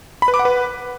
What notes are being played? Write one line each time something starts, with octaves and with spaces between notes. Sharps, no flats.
B5
B4
D6
F#5
B4